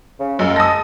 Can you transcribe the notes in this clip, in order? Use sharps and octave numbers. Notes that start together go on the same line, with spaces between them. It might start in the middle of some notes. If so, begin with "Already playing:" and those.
C#3
F#2 G#3
A5 D#6 A#6